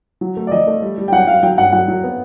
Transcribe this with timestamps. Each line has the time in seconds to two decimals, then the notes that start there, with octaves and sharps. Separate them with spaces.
0.21 F#3
0.37 A3
0.47 D5
0.52 F3 D#5
0.67 A3
0.82 G3
0.98 G3
1.08 G5
1.12 F#3 F#5
1.27 F#3 F5
1.43 F#3 G5
1.58 G2 F#5
1.73 F#3 F#5
1.88 F#3
2.04 B3